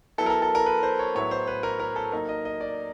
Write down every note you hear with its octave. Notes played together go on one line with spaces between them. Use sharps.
F#3 B3 E4 A4
A#4
A4
A4
A#4
B4
C5
C#5
A2 F#3 B3 E4 C#5
C5
B4
A#4
A#4
A4
F#3 A#3 D#4 A#4
D#5
D#5
D5